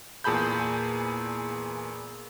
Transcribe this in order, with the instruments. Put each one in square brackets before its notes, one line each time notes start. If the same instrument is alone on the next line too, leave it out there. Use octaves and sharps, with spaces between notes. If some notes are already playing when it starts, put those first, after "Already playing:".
[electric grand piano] E2 A#2 G#4 A5 B5 G6